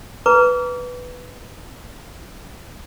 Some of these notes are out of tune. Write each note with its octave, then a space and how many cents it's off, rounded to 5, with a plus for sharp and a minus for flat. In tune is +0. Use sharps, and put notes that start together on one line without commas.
B4 +0 A#5 +0 D6 -40